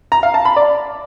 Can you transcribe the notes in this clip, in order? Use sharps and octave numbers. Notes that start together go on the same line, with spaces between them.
A#5
F5
A5
B5
D5